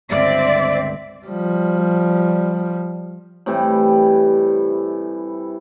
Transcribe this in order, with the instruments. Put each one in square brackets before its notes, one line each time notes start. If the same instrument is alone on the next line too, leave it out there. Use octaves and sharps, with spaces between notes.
[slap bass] G1 C#2 G2 [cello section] C4 D5 [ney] E5
[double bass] F3 G3
[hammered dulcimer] A2 C3 E3 G3